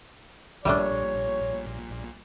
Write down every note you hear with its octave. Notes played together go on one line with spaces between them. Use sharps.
A#1 A#2 G3 A3 D4 C#5